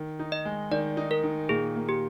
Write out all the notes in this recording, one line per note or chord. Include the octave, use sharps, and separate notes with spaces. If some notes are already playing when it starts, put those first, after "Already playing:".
Already playing: D#3
D#4
D#5
G#3
D#3 D5
D#4
A#4
D#3
A#2 G#4
A#3
G4